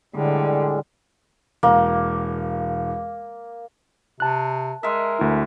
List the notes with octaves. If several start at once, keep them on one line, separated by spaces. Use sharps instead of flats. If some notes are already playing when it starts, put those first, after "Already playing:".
A2 D3 G3 G#3
E1 A#3
C3 A5 F#6
G#3 A#4 E5
D2 E4